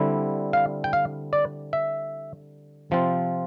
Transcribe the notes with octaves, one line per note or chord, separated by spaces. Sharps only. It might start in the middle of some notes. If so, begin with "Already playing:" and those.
Already playing: D3 G3 C4 E4
F5
G5
F5
D5
E5
C3 F3 C4 F4